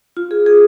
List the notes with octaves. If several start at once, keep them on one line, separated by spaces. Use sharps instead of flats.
F4
G#4
G#4